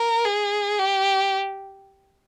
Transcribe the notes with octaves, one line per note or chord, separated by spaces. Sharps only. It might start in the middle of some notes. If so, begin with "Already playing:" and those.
Already playing: A#4
G#4
G4